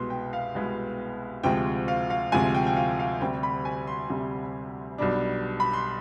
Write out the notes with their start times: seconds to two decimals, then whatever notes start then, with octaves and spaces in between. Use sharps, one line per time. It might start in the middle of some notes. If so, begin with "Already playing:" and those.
Already playing: C2 B2 G#3 B3 C6
0.10 G5
0.33 F5
0.55 C2 B2 G#3 B3
1.43 D2 C3 F3 G#3 G5
1.88 F5
2.10 F5
2.32 D2 C3 F3 G#3 G#5
2.54 G5
2.67 G5
2.76 F5
2.99 F5
3.21 D2 C3 G3 G5
3.43 B5
3.65 G#5
3.87 C6
4.10 D2 C3 G3
4.98 B1 B2 G3 D4
5.60 B5
5.73 C6